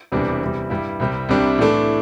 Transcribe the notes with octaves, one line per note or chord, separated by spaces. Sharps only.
E1 E2 C3 G3 D4
E2 C3 G3
G2 G3 E4
C2 C3 G3
C2 C3 G3 D4
A2 E3 A3 D4